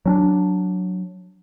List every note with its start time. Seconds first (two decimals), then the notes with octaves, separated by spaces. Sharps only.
0.06 F#3 C#4 D4